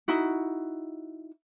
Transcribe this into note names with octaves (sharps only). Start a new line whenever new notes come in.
D#4 E4 F#4